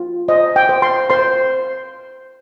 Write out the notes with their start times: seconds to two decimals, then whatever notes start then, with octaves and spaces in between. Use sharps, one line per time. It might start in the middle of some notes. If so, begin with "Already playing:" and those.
Already playing: F4
0.28 C5 D#5
0.56 G5
0.69 C5
0.82 C6
1.10 C5 C6